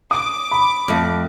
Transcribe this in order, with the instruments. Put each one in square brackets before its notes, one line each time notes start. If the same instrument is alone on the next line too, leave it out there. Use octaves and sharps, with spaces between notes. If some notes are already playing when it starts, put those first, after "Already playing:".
[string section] D6 [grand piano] D#6
[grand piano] B5
[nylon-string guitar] F2 A3